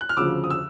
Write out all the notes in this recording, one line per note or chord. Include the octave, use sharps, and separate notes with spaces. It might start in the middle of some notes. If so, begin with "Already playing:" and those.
F#6
F6
D2 C#3 F3 D6 E6
D#6
E6